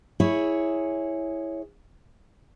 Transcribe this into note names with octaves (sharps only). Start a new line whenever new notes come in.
E4 G#4 C#5